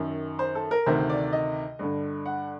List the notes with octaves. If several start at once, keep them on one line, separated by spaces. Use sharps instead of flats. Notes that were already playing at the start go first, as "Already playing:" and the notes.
Already playing: F#2 D#3
C5
A4
A#4
D2 C3 D#3 C5
D5
D#5
G2 D3
F#5